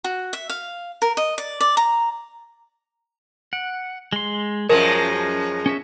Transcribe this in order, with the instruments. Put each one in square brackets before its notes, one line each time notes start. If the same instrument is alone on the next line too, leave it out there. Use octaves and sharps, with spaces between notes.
[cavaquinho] F#4
E5
F5
A#4
D#5
D5
D5
A#5
[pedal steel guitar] F#5 [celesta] D7
[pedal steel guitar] G#3 C6
[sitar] F#2 F3 G#3 [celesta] A#4 [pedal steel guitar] C#5 A5 A#5
[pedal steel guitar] C#4 C#5 E5